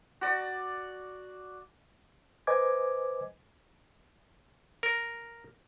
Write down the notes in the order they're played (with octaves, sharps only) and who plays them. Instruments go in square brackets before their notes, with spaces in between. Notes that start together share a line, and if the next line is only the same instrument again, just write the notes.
[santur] F#4 D5
[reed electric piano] B4 C5 D#5 G#5 D6 G#6
[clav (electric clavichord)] A#4